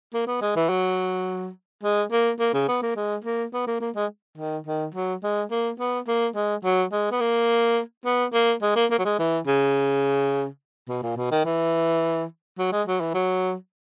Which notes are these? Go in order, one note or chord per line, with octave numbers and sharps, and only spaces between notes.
A#3
B3
G#3
E3
F#3
G#3
A#3
A#3
C#3
B3
A#3
G#3
A#3
B3
A#3
A#3
G#3
D#3
D#3
F#3
G#3
A#3
B3
A#3
G#3
F#3
G#3
B3
A#3
B3
A#3
G#3
A#3
A#3
F#3
G#3
E3
C#3
B2
A#2
B2
D#3
E3
F#3
G#3
F#3
E3
F#3